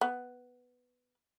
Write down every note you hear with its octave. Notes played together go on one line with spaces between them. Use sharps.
B3